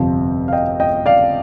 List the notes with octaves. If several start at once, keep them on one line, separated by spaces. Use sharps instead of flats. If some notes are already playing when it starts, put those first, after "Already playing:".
Already playing: G1 F2 C3 F3
F5
D#5 G5
D#5 G5
D5 F5